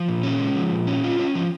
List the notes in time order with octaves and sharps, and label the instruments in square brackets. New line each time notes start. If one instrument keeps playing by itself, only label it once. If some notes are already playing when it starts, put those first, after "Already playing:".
Already playing: [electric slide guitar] F3
A#2
C#4
G#3
F3
A#2
C#4
F4
C#4
F3